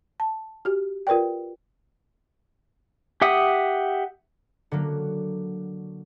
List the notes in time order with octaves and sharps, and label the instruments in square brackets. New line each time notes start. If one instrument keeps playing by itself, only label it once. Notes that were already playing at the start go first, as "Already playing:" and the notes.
[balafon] A5
F#4 G4
F4 A#4 B4 D5 G5
[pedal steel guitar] G4 E5 F#5 D#6
[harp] D3 F#3 A#3